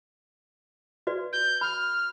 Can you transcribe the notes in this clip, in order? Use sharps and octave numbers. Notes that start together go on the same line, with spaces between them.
F#4 B4 D5
G6
B5 F6